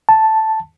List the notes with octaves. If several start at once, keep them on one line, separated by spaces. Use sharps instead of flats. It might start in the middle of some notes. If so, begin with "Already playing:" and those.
A5